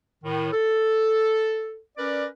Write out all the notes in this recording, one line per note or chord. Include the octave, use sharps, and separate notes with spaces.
A2 D#3
A4
C#4 A#4 B4 D5